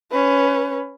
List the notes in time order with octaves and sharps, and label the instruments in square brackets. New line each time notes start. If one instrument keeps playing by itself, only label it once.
[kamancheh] C#4 B4